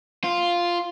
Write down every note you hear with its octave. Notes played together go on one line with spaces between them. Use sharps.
F4